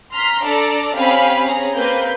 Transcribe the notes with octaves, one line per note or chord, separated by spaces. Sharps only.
A#5 C6 F6 B6
D4 A4 D5 A#5
C4 C#4 G4 F5 G#5 B5
C#4 G#4 A#5
A#3 C4 B4 G6